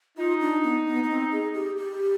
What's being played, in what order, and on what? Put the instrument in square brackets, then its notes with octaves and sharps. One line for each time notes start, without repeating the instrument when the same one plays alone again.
[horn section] D#4 [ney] F4
[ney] D4
B3
B3
B3
C4
G#4
G4
G4